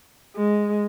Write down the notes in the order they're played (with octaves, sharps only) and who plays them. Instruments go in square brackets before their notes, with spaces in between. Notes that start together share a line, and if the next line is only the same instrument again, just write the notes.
[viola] G#3